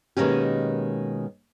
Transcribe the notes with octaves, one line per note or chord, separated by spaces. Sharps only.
B2 D#3 G#3 A#3 C#4 G4